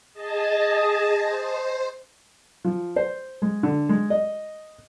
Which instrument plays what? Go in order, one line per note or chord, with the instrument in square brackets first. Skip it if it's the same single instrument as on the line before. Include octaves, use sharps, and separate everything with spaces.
[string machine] G#4 D#5 A5
C5
[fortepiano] F3
C5
G#3
D3
G#3
D#5